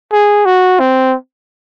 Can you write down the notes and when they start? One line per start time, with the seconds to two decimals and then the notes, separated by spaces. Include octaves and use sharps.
0.12 G#4
0.45 F#4
0.80 C4